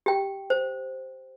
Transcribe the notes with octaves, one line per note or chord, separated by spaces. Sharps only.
G4 G5
C5